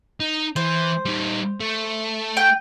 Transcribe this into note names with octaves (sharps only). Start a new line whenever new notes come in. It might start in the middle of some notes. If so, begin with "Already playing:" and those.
D#4
E3 C5
G3 D#4
A3
G5